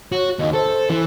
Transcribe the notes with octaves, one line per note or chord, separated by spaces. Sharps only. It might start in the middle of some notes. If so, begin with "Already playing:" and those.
F#4 C#5
D#2 D#3 D#5
A4 C5
E3